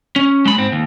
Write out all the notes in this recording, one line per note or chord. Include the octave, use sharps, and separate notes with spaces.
C#4
G#3 B5
G#2 C4
D#2